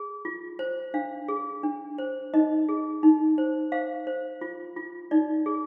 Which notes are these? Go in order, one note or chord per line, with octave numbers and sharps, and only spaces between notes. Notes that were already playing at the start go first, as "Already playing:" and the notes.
Already playing: G#4
F4
C5
D4 F5
G#4
D4
C5
D#4 D#5
G#4
D#4
C5
C5 F5
C5
F4
F4
D#4 D5
G#4